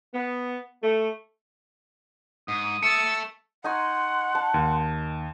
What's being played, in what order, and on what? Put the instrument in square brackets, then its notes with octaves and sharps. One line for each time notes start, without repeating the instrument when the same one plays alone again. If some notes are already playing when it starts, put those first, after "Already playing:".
[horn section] B3
A3
[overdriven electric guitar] G#2 [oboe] D#6
[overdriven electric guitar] A4 E5 [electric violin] E6 A6 [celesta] C#7
[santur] D#4 G#5 C#6 [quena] F#5 [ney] C6
[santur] A5
[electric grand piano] D#2